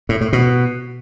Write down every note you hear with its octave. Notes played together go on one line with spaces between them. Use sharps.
A2
A2
B2